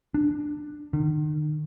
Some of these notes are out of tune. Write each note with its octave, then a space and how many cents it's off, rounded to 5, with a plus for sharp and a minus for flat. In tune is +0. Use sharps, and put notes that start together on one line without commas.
D4 +15
D#3 -40